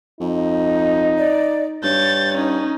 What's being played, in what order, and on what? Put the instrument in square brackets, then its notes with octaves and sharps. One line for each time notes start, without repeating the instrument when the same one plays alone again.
[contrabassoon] F2 [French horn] D#4
[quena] D5
[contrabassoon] G2 [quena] C#5 [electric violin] G6 A6
[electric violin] C#4 D#4